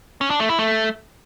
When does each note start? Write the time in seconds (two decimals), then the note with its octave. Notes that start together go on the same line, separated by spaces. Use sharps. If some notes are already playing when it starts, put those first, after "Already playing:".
0.21 C#4
0.30 D4
0.40 A3
0.49 E4
0.59 A3